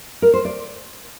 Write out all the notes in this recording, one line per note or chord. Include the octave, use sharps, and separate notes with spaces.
A#4
C5
D5